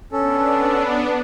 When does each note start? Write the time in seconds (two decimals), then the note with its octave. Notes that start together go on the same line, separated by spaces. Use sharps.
0.12 B3 C#4 D4 A4